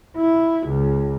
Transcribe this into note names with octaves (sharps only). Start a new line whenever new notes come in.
E4
C#2